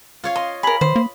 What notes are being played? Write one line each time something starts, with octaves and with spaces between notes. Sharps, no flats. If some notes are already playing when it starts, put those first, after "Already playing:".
F4 C#5 F5
D#5 C6
G#4 A#4 B5 B6 F#7
D#3 C5
A#3